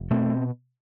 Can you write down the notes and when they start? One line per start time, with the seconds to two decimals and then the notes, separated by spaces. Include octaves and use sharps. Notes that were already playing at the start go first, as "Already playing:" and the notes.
Already playing: F1
0.11 B2 A3 C4